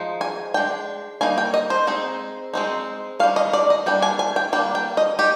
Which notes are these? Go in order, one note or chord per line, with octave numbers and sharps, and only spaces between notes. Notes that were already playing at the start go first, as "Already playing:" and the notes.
Already playing: F3 G#3 D#4
G#5
G#3 D4 G5
G3 A#3 D#4 G#5
G5
D#5
C5
G#3 C4 D#4
G#3 C4 D#4
D#3 G3 D4 F5
D#5
D5
D#5
G3 A#3 D4 G5
G#5
G#5
G5
G3 A#3 D4 G5
G5
D#5
D#3 G4